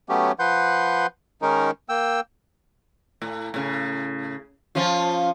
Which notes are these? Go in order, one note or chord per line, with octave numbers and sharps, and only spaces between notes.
F#3 A3 B3 C#4 G4
F3 B4 F#5 C6 G6
D#3 G#3 C#4 D#4 A#4
A#3 G5 E6
A2
A2 C#3
F3 C#4 F4